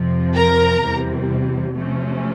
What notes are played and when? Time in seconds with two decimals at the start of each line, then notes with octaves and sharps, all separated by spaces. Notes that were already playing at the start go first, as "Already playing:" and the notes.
Already playing: F2 C3 F3
0.35 A#4 A#5
0.82 E2 C3 E3 G3
1.76 C3 F3 A3 C#4